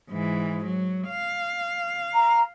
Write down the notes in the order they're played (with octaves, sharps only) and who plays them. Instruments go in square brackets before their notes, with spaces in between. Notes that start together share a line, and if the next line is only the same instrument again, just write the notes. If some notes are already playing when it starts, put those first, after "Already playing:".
[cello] G#2 E3
F#3
F5
[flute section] A#5